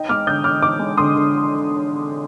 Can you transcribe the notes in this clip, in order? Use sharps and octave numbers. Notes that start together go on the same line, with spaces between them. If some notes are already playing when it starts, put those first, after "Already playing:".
Already playing: D#4 D#5 G5
G#3 D6 F6
D3 D#6 G6
D3 D6 F6
D#4 D6 F6
G#3
D3 C6 D#6
D3